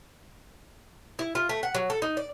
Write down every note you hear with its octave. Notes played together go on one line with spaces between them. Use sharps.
E4
F4
A3
F#5
F#3
A4
D#4
D5